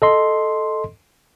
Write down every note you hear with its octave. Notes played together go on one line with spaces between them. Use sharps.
A4 D#5 C6